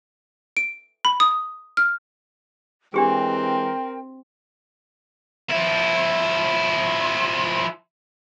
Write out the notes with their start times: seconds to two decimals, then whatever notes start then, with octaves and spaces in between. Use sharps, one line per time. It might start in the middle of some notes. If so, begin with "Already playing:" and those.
0.57 D7
1.05 B5
1.20 D#6
1.77 F6
2.94 E3 G#3 C4 D4 G4 G#4 A#4 G5
5.50 F3 E4